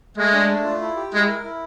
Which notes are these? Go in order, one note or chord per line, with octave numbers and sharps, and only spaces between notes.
G#3 A3
D4
A3
F4
E4
G4
G#3 E4
A#4
E4